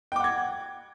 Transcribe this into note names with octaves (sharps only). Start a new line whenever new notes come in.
F#5 G5 D6 G#6